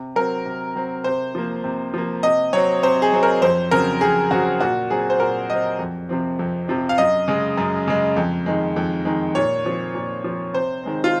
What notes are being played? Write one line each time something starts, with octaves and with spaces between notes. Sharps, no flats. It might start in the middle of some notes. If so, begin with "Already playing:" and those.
Already playing: C3
F#3 C4 A#4
C3
F#3 C4
C3 C5
F3 A#3
C3
F3 A#3
C3 D#5
F#3 C4 C#5
C3 C5
G#4
F#3 C4
A#4
F2 C5
C#3 F#3 C4 A#4
F2 G#4
C#3 F#3 C4 F#4
A#2 F#4
F#3 C4 G#4
C5
A#2 A#4
F#3 C4 D#5
F2
C3 F3 C4
F2
C3 F3 C4
F5
F#2 D#5
C#3 G#3
F#2
C#3 G#3
F2
D#3 G#3
F2
D#3 G#3
A#2 C#5
F3 C4
A#2
F3 C4
C3 C5
D#3 G#3 C4
F4